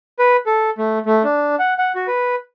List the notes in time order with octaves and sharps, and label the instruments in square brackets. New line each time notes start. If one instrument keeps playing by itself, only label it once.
[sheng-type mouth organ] B4
A4
A3
A3
D4
F#5
F#5
F#4
B4